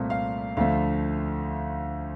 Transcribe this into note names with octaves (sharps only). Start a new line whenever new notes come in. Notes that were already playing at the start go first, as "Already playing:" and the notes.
Already playing: C2 A#2 A3 C4
F5
D2 D3 F3 A3 F5